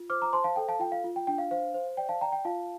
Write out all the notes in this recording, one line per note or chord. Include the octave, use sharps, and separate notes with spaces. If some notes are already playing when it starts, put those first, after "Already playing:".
Already playing: F4
C5 D6 F6
A#5 D6
C5 A5 C6
F5 A5
A4 G5
F5 A5
F4 G5
F5
F4
G5
D4 G5
F5
C5 F5
C5
D5 G5
F5 A5
D5 G5 A#5
G5
F4 F5 A5